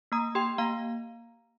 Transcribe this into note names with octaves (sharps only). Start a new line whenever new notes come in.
A#3 A#5 D#6
G4 G5 C6
A#3 F5 A#5